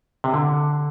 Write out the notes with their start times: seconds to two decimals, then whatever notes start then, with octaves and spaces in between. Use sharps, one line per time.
0.24 C3
0.34 D3